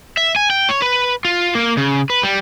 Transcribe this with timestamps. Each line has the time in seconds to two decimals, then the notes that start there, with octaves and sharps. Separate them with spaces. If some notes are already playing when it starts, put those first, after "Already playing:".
0.17 E5
0.36 G#5
0.50 G5
0.69 C#5
0.82 B4
1.25 F4
1.55 A#3
1.77 C#3
2.10 B4
2.23 G3